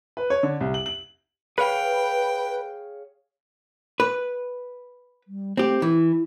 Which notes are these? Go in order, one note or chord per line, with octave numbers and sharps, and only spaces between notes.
B4
C#5
D3
C2
F#7
F#7
G#4 B4 C#5 F5 G5
B4
G3
A3 C4 G4
E3 E4